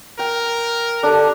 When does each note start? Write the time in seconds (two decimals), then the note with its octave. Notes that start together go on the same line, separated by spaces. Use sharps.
0.19 A#4 G5
1.03 D4 G4 A4 A5